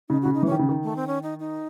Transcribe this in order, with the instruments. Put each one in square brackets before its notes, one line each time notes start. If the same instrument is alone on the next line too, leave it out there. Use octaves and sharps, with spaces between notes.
[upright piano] C#3 [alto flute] D#4
[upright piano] C#3 [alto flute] F#4
[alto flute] D#4
[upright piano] E3 [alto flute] C#4
[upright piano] D#3
C#3
D#3
[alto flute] A3
C4
C#4
D#4
D#4